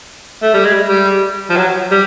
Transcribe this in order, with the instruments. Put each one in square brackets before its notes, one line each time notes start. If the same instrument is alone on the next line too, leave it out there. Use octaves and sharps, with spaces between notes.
[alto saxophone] A3
G3
G#3
G3
F3
F#3
G3